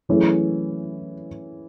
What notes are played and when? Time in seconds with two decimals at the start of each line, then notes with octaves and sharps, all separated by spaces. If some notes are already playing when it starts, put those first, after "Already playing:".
0.09 E3 F#3 A3 C#4 E4 G#4